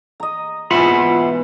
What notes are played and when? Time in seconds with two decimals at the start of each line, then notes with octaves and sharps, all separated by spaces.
0.20 D#5 A#5
0.71 G#2 B2 E3 F4 E5 F#5 B5